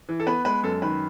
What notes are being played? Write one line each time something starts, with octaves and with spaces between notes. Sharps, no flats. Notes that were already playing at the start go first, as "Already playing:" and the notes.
E3
A4
B3 B4
G#3 B4
F#2 A4
D#3 B4